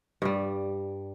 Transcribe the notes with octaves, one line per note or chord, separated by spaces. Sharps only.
G2 G3